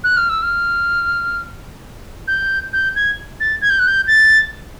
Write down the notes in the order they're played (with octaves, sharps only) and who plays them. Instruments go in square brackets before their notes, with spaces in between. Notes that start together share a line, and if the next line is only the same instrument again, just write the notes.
[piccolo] F#6
F6
E6
F6
G6
G6
G#6
A6
G#6
G6
F#6
G6
A6